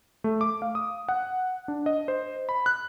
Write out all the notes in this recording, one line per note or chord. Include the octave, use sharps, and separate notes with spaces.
A3
D6
F5
D#6
F#5
D4
D#5
C5
B5
F#6